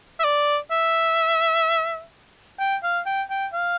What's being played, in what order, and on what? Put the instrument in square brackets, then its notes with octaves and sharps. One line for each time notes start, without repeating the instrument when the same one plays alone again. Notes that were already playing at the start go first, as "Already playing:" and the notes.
[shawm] E5
D5
E5
G5
F5
G5
G5
F5